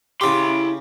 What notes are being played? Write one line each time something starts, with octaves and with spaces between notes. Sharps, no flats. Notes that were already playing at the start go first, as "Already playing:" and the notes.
C#3 E4 G4 C6